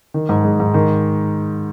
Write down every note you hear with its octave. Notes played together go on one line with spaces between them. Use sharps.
D#3
G#2
G#3
G#2
D#3